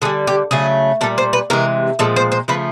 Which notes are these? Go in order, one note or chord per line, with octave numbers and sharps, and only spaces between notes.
D3 G3 G#4
G4
C#3 F#3 A3 G#4
A#2 G3 A4
C5
B4
C3 E3 G#3 A#4
A#2 F3 G#3 A4
C5
C5
C#3 F3 A3 B4